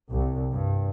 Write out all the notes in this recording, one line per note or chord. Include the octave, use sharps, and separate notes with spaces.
C2
G2